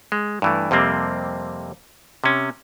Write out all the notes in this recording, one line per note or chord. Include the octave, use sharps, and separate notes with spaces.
G#3
G2 E3 A3
F2 C3 G3 A#3 C4
C3 C#4